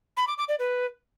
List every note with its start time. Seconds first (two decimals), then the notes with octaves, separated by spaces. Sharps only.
0.17 B5
0.28 D6
0.38 D6
0.49 D5
0.59 B4